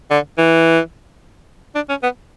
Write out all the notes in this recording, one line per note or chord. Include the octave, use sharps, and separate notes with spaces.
D3
E3
D4
C#4
B3